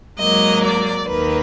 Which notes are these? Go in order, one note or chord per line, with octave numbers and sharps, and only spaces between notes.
G#2 F#3 A#3 D#5
D5
D#2 D#3 A#3 B4